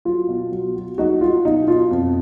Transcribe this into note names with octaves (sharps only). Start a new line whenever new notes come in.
F#3 F4
B2
F#3
F#3
F#3 D#4 F#4
F#3 F4
B2 D#4
B2 F4
F2